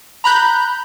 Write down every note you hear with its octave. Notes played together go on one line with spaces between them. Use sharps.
A#5 B5 F#6 G6